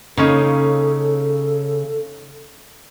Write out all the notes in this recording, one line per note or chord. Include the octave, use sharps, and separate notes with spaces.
C#3 A#3 C#4 D#4 A4